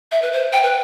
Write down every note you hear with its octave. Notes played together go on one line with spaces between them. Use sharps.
E5
B4
C5
G5
B4